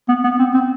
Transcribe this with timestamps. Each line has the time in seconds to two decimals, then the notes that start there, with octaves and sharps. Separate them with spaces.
0.09 B3
0.24 B3
0.39 C4
0.54 C4